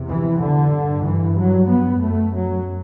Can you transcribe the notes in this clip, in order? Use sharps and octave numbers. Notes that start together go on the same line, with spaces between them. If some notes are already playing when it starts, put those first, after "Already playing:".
Already playing: E2 C3
E3
D3
G2
E3
F#3
B3
F#2 A3
F#3